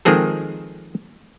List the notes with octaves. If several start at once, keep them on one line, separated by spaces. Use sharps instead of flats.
D#3 F3 G#3 C4 G#4 A4